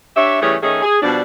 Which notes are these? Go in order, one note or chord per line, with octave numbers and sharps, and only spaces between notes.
D4 G4 C#5 E5
E3 G3 A3 C#4 G#4 C#5
D#3 A3 C#4 D#4 G#4
G#4
B2 F3 G3 D4